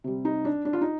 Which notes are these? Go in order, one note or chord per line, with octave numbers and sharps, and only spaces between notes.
C3 G3
D#4
D4
D4
F4
D#4